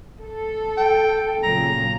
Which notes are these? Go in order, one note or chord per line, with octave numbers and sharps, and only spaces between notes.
A4
G5
A#2 C#3 F#3 A#5